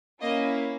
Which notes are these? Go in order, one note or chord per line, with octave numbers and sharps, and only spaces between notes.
A#3 C#4 E4 D#5